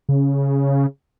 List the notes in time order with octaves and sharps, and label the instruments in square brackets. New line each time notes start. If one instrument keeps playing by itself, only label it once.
[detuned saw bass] C#3